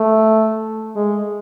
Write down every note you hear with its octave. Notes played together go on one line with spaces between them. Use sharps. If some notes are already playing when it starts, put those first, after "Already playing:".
Already playing: A3
G#3